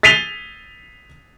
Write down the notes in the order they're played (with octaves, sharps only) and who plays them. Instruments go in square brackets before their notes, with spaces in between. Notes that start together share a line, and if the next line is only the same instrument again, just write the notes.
[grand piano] A6 B6 C7 D#7 F7 G7